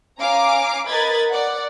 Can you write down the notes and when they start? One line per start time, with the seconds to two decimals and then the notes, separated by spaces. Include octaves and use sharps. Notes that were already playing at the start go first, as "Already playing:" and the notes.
0.18 C#4 F5 G#5 A#5 D6 D7
0.86 A#4 B4 D#5 B5 G#6 A6
1.27 D5 F#5